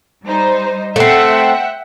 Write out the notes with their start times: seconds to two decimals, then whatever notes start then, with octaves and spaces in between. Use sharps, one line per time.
0.25 G3 D#4 C5
0.96 A3 C4 E5 F#5 G5